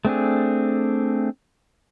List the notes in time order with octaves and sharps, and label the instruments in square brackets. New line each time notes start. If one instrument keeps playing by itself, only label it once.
[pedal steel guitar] A3 C4 D4 G#4